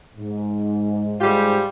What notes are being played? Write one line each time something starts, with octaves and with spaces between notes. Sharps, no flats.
G#2
G#2 G3 F4 G4